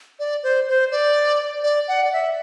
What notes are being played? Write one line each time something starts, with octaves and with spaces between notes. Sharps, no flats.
D5
C5
C5
D5
D5
F#5
D5
E5